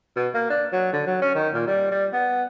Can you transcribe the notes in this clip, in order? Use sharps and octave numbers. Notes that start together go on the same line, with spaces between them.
B2
A#3
D4
F#3
D3
F#3
C#4
D#3
A#2
G3
G3
B3